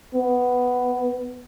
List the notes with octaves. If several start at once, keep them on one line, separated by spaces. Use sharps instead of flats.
B3